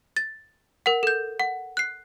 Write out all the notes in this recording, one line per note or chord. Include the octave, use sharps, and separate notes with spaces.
A6
A#4 F#5
A4 G6
F#5
F#6 C7